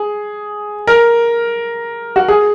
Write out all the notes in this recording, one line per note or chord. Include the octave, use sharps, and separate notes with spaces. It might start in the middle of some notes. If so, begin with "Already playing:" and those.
Already playing: G#4
A#4
F#4
G#4